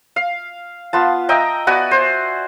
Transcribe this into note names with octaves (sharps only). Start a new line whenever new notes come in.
F5
B3 F4 A5
D#5 E5 G5 A#5
B3 F#4 D5 G#5
C5